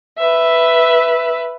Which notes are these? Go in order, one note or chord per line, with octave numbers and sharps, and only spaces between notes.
B4 E5